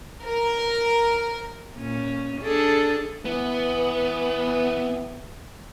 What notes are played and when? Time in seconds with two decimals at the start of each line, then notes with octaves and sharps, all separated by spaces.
0.24 A#4
1.74 A#2 C#4
2.41 D4 G#4 A4
3.25 E3 B3